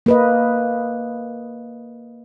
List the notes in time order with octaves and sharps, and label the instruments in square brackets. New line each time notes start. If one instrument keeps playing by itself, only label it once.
[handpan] A#3 B4 D#5